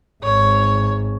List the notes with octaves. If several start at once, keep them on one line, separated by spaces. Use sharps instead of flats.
G#1 G#2 C#5